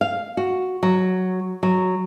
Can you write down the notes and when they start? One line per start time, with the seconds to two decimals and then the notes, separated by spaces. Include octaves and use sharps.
0.01 F5
0.37 F#4
0.83 F#3
1.63 F#3